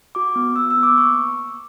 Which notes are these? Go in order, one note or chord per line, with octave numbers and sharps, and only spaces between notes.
F#4 D6
B3
B3 E6
E6
B3
D6
A#3 C#6